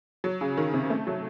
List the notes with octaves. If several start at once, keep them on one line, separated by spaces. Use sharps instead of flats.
F#3
C#3
D#3
C3
A3
F#3